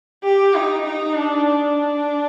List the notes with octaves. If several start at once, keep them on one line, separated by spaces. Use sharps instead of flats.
G4
D#4
D#4
D4
D4